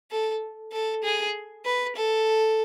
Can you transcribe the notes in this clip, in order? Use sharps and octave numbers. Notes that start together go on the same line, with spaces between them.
A4
A4
G#4
B4
A4